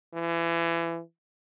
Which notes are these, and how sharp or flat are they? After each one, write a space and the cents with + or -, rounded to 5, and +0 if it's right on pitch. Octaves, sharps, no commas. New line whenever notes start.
E3 +30